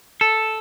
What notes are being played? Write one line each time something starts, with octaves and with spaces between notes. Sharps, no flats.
A4